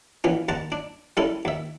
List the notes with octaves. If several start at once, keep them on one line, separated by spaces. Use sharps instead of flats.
A#1 E3 C#4
D#2 F#5 A5 A#5 C#6
D4
G3 C#4 E4 A4
D#2 E5